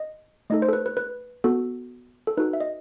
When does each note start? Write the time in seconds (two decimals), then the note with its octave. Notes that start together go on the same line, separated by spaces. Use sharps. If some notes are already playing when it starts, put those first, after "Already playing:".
Already playing: D#5
0.50 A3 D#4 A4 D#5
0.62 C5
0.69 A4
0.73 B4
0.86 B4
0.97 B4
1.44 B3 F#4 A4
2.27 A4
2.37 D#4 F#4 A4 B4
2.53 E5
2.60 D#5